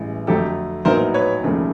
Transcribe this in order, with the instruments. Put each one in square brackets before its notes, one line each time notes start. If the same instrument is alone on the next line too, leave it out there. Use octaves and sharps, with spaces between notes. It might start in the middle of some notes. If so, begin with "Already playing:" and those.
Already playing: [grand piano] A1 G2 E3 G#3
F2 D3 F#3 A3 G4 A4
A#1 A2 F#3 B3 D#4 A#4 C5
B4 C#5
E1 D#2 C#3 F3 A3